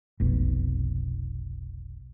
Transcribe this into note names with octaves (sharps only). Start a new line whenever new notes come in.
F1 B1